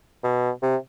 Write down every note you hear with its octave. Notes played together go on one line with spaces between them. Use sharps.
B2
C3